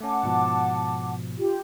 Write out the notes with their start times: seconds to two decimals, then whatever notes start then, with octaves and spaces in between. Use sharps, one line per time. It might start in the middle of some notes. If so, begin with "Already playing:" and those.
0.01 A3 C#4 F#5 A5 D6
0.23 G#2 B2 F3
1.38 F4 G4